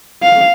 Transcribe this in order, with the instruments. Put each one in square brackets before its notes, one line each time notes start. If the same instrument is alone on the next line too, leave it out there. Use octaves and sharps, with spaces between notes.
[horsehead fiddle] F5